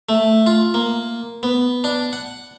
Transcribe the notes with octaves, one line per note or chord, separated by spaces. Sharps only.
A3
F4
A#3
B3
D4
F#5